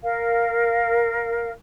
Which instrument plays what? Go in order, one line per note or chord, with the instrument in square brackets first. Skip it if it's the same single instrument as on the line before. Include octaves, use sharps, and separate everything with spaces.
[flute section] A#4 F5